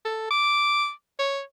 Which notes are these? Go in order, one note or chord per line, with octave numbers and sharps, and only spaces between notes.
A4
D6
C#5